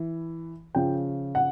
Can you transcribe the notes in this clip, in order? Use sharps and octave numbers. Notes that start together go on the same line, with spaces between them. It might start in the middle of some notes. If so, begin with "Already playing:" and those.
Already playing: E3
C#3 F3 G5
F#5